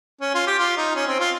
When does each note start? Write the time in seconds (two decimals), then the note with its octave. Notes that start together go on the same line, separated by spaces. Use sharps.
0.21 C#4
0.35 F4
0.47 G4
0.58 F4
0.77 D#4
0.96 C#4
1.07 C4
1.20 F4